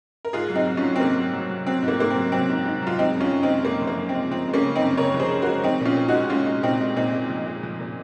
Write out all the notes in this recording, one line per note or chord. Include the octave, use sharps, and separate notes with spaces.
A#4
G#2 F4 G#4
F#3
C4 D#4
F#3
C#4 F4
F#3
C4
G#2 A#3
F#3
F#3
F#3
F#3 C4
G#2
A#3
G#2 A#3
F#3 C4
F#3 C4
G#2
G#2
F#3 F4
G#3 C4 D#4
F#2
C#4 F4
F#2
C4 D#4
G#3
F#2 A#3
F3
A#3
F#2
C4
G#3
F3 C4
G#3
A#3 C#4
C#3
C4 D#4
F#2
C#3 A#4 C#5
F3
G#4 C5
C#3
F#4 A#4
G#3
F3 C4 D#4
A#2 C#4 F4
A#2
D#4 F#4
G#3
G#3 C#4 F4
G#3
A#2 C4 D#4
G#3
A#2 C4 D#4
G#3
F3
G#3
F3
A#2